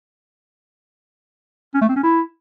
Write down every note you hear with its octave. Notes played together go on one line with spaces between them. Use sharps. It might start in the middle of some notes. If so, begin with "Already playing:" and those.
C#4
A3
C4
C#4
E4